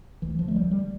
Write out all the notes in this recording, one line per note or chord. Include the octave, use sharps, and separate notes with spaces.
D2 E3
F3
D3 A3
G3
D2 G3